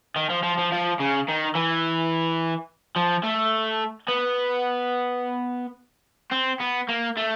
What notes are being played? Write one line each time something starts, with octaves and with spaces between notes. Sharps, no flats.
D#3
F3
F3
F3
F3
C#3
D#3
E3
F3
A3
B3
C4
B3
A#3
A3